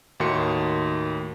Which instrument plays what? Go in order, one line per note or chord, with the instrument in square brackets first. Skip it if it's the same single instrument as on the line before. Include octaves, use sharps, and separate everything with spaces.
[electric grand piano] D#2 A2 D#3 F#4 C6 C#7